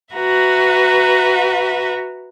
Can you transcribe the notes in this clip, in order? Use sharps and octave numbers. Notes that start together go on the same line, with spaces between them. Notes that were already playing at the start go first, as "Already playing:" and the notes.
F#4 B4 E5 A#5